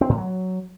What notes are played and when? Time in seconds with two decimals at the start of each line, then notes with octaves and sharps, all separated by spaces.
0.01 C4
0.09 A2
0.17 F#3